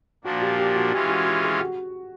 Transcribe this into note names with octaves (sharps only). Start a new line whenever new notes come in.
A#2 F3 A#3 D4 F#4
G4
G4
F#4
E3 G#3 C#4 F4 G4
F#4
G4
G#4
F#4